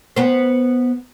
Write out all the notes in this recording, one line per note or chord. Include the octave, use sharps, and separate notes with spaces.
B3 C5